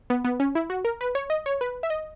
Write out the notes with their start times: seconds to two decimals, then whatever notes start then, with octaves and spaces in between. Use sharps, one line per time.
0.10 B3
0.25 B3
0.40 C#4
0.55 E4
0.70 F#4
0.85 A#4
1.01 B4
1.15 C#5
1.30 D#5
1.46 C#5
1.61 B4
1.83 E5
1.90 D#5